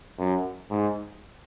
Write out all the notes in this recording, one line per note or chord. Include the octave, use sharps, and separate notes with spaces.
F#2
G#2